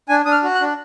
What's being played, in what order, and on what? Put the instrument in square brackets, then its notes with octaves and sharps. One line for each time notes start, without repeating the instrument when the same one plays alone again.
[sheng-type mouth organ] D4 G#5
D4 D#6
F6
F#4
F#6
D4